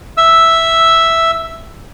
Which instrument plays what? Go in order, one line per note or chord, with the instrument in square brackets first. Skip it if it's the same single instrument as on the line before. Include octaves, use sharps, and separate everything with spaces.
[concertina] E5 E6